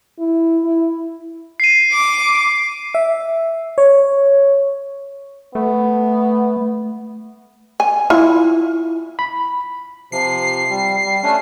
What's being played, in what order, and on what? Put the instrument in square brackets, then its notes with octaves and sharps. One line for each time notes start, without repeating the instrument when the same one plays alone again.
[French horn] E4
E4
[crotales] C7 D#7
[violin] D6
[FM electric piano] E5
C#5
[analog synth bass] A3 [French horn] B3
[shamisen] G#5
[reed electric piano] E4 [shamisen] F4
[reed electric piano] B5
[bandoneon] C3 F3 [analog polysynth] C7
[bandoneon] G3
G3
A3 C#4 D4